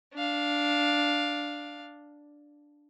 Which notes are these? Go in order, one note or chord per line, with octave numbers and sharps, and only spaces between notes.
D4 F5